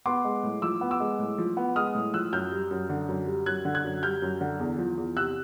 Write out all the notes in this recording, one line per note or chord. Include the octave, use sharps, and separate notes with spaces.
B3 C6 D6
G#3
A2
F3 D6 E6
B3
D6 E6
G#3
A2
F3
B3
G#3 D#6 F6
A2
F3 E6 F#6
F#2 F6 G6
G3
F#2
D3
F#2
G3
F#2 F#6 G#6
D3
F#6 G#6
F#2
G3 F6 G6
F#2
D3
E2
F3
E2
C3 E6 F#6